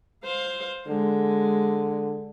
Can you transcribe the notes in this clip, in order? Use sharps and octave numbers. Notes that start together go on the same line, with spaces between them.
C5 F5
D3 G#3